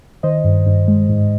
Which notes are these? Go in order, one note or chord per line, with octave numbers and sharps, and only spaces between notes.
D#3 C5 D#5
G2
G2
G#3
G#2